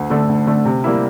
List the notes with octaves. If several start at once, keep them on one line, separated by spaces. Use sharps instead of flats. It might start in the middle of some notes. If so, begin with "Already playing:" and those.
Already playing: D2
D3 A3
D2
D3 A3
C3
G3 A#3 E4